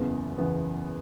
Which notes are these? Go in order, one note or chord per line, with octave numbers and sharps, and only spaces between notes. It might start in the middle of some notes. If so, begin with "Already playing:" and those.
Already playing: F#1 E2 C#3 E3 B3
F#1 E2 C#3 E3 B3